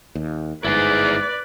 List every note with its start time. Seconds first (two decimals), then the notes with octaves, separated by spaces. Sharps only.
0.15 D#2
0.64 G1 G#2 E4 G#4 B4 D5